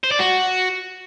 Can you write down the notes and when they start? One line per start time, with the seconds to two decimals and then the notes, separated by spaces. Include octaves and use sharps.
0.04 C5
0.12 D5
0.19 F#4